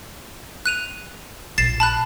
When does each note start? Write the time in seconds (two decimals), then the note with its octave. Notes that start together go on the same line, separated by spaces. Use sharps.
0.66 F#6 D#7 F7
1.58 A#1 A6 C7 E7
1.80 A5 B5 F#6